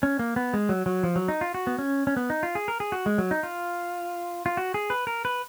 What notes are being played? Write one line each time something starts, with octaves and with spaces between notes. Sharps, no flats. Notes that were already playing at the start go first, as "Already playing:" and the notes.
C#4
A#3
B3
G#3
F#3
F#3
F3
F#3
D#4
F4
F#4
B3
C#4
C#4
B3
D#4
F4
G#4
A#4
G#4
F#4
G#3
F#3
D#4
F4
F4
F#4
G#4
B4
A#4
B4